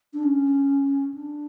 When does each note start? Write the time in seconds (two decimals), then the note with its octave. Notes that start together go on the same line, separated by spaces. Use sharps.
0.14 D4
0.23 C#4
1.14 D4